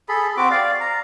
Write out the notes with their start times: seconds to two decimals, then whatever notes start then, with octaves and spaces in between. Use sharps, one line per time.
0.09 G#4 A4 B5
0.37 C4 F#4 D6
0.51 D5 F5
0.81 A#5